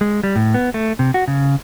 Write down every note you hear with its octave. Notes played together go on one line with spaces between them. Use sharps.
G#3
G3
A2
B3
A3
C3
F#4
C#3